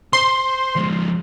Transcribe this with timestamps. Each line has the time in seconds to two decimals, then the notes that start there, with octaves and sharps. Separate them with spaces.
0.13 C5 C6
0.76 F3 G#3